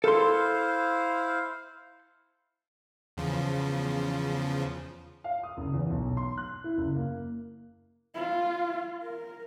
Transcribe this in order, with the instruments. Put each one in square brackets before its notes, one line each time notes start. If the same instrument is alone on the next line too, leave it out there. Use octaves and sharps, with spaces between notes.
[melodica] E4 C5 F5 [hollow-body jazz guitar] A4 C6
[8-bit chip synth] E2 C#3 F3
[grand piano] F5
D#6
F#1
E2
B1
C6
F#6
E4
F#1
A#3
[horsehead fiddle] F4
A#4